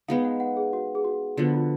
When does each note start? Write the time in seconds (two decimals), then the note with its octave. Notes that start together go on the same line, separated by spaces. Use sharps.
0.08 G#3 B3 D#4 F5
0.25 F#5
0.40 F#5
0.57 G#4
0.73 F#4
0.95 G#4
1.05 F#4
1.37 D3 F3 B3 F#4
1.54 F4